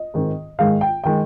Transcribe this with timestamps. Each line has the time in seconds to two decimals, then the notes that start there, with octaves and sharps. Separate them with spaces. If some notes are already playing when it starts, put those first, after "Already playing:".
Already playing: D#5
0.14 G#2 D#3 G#3 C4
0.59 G#2 D#3 G#3 F5
0.81 G5
1.04 D#3 G#3 G5